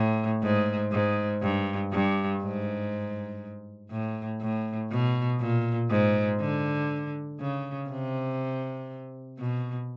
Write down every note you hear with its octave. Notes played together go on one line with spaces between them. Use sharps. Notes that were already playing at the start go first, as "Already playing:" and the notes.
Already playing: A2
G#2
G#2
G2
G2
G#2
A2
A2
B2
A#2
G#2
D3
C#3
C3
B2